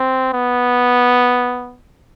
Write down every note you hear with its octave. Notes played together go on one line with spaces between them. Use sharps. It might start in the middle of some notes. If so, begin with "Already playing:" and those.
Already playing: C4
B3